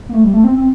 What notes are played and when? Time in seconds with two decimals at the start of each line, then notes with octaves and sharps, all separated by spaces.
0.09 A#3
0.14 A3
0.24 G3
0.33 A3
0.44 C4
0.54 C4